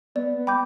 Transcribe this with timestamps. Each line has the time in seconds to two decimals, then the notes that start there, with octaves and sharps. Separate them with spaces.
0.15 B3 D5
0.37 B3
0.47 G5 B5 D6 G6